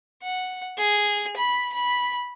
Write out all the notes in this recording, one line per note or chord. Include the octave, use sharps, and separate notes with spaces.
F#5
G#4
B5
B5